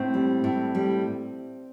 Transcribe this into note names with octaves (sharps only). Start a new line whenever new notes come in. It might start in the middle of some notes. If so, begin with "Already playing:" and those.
Already playing: A2 C4
G3
A2
G3